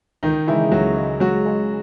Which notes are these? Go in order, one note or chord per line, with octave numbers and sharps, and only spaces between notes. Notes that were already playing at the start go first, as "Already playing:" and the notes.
C#2 D#3 D#4
C#3 E3 G#3 E4
C#2 F#3 F#4
C#3 G#3
C#2 F#3 F#4
C#3 G#3